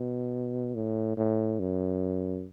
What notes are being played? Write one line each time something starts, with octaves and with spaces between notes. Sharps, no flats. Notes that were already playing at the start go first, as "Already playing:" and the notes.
Already playing: B2
A2
A2
F#2